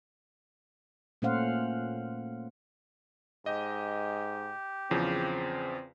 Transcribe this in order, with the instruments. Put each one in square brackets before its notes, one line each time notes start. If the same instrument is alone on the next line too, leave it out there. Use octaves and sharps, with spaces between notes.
[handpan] A#2 A3 C#4 C5 F5 F#5
[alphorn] G#2 [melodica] G4 [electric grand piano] D#5
[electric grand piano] E2 C#3 F3 [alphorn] C4